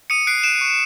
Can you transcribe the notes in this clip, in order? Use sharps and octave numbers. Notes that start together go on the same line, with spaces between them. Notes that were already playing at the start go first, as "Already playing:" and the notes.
D#6 C#7 D#7
F#6 C7 D7
F#6 D7 E7
C#6